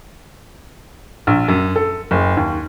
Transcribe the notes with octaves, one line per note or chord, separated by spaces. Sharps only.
A#1
F#2
A4
F#1
D#2